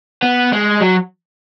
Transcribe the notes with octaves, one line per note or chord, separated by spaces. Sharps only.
B3
G#3
F#3